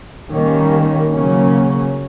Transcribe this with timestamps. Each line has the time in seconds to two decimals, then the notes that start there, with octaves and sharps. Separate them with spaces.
0.31 D#3 G3 A#3 C#4
1.13 C#3 F#3 A#3 C#4